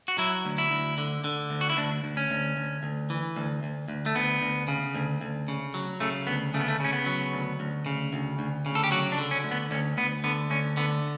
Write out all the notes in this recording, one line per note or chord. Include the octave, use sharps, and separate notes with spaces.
F#4
F#3 E4
D2
E4
D2
D3
D3
D2
F#4
E4
D2 D4
D2
C#4
D2
D2
D2
E3
D2
D2
D2
A3
D2 B3
D2
C#3
D2
D2
C#3
F#3
C#3 A3
D2 B3
C#3 A3
B3
A3
C#3 C#4
B3
F#3
D2
D2
C#3
D2
D2
C#3
A4
G4
F#3 F#4
D4
D3
C#4
D2
B3
D2 C#4
D2 B3
D3 B3
D2 C#4
D3 B3